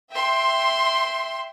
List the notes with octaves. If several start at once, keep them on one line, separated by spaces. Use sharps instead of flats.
E5 G5 C6